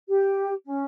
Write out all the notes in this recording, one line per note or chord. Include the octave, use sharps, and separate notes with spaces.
G4
C#4